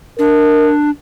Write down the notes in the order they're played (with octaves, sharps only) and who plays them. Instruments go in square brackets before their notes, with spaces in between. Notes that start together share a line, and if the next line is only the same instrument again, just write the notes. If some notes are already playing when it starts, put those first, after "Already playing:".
[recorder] D4 [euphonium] A#4